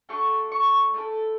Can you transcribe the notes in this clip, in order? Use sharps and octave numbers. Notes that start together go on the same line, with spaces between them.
A3 D4 F#4 A4 C#6
C#6
A3 E4 A4